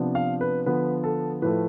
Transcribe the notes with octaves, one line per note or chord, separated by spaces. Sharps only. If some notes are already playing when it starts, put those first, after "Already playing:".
Already playing: C3 F3 B3 D4
F5
B4
D3 F3 B3 B4
A4
A2 F3 A3 B4